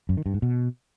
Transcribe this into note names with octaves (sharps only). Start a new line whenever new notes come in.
F#2
D#3
G2
G#2
B2